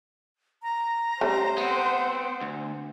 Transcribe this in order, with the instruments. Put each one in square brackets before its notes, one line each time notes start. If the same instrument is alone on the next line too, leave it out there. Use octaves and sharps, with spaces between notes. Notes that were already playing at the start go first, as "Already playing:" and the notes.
[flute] A#5
[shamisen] G3 A3 C#4 [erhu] C5
[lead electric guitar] B3 C4 [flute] F#5
[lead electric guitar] D2